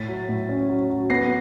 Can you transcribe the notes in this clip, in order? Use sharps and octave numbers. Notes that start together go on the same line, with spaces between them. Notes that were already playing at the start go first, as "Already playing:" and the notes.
Already playing: A2 A6 B6
F#3
A2
C#4
F#3
F#3
B3 A#6 C7